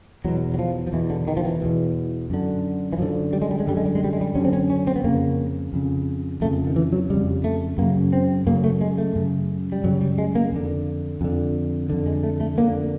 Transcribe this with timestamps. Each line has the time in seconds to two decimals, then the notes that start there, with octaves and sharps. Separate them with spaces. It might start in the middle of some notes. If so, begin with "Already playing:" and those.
0.24 E2 B2 F#3
0.54 F#3
0.59 F3
0.87 F3
0.93 E2 B2 E3
1.10 D3
1.28 D#3
1.37 F3
1.45 E3
1.62 E2 B2
2.30 F#2 D3
2.93 E3
2.98 F#2 D3 F3
3.33 G3
3.42 G#3
3.51 G3
3.60 G#3
3.67 F#2 D3 G3
3.77 G#3
3.86 G3
3.95 G#3
4.04 G3
4.13 G#3
4.21 G3
4.35 F#2 D3 C#4
4.45 C4
4.53 C#4
4.70 C#4
4.87 C4
4.96 B3
5.04 F2 C#3 A#3
5.73 F2 C#3
6.41 F2 A3
6.45 C#3
6.67 D#3
6.76 E3
6.93 F#3
7.10 F2 C#3 G3
7.44 A3
7.78 F#2 C#3 A#3
8.13 C4
8.46 F#2 C#3 A#3
8.64 A3
8.81 G#3
8.98 A3
9.15 F#2 C#3
9.72 G3
9.84 F#2 C#3 F#3
10.01 G3
10.18 G#3
10.35 A#3
10.53 F2 D3
11.21 F2 D3
11.90 F2 D3
12.06 G#3
12.23 A3
12.41 A3
12.58 F2 D3 A#3